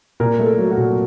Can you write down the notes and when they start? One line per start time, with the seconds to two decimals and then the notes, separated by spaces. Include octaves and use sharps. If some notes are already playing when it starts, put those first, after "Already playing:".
0.20 A#2 A#4
0.39 A3
0.46 A4
0.58 F#3
0.71 F#4
0.77 A#2